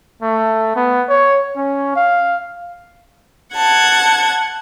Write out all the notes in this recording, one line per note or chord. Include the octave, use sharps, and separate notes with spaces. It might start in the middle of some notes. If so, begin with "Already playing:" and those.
A3
B3
C#5
C#4
F5
F#5 A5 G#6